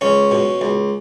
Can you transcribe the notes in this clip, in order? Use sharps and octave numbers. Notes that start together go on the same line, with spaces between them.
C#2 C#4
B2
C#2